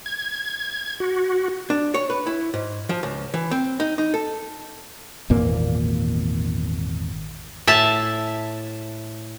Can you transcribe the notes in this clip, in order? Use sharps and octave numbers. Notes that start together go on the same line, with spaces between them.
G#6
F#4
D4
C#5
B4
E4
G#2
F3
C#2
E3
C4
D#4
D#4
A4
G#1 E2 A#2 A#3
A2 E5 A5